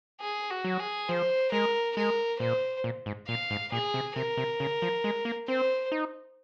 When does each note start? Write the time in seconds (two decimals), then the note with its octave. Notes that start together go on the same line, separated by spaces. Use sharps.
0.21 G#4
0.50 F#4
0.65 F#3
0.80 G#4
1.09 F3 C5
1.52 G#3 A#4
1.96 G#3 A#4
2.40 A#2 C5
2.84 A#2
3.06 G#2
3.28 A#2 F5
3.50 G#2
3.72 A#2 G#4
3.94 C3
4.15 C3 A#4
4.37 C3
4.60 C#3
4.82 F3
5.04 G#3
5.25 A#3
5.48 C4 C5
5.92 D#4